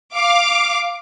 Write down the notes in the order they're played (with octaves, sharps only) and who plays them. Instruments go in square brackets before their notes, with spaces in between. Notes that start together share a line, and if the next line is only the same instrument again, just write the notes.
[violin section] F5 D6